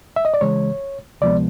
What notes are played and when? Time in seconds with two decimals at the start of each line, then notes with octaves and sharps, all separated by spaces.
0.16 E5
0.25 D#5
0.34 D5
0.41 C#3 E3 G#3 C#5
1.21 D2 C3 F3 G#3 B3 D5